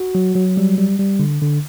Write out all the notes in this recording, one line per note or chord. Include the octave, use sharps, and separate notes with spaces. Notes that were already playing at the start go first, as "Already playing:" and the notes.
Already playing: F#4
F#3
F#3
G3
G3
G3
D3
D3